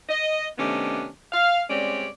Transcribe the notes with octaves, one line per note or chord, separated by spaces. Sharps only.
D#5
C3 D#3 A3 B3 C#4 D4
F5
G3 G#3 C4 C#4 C#5 D5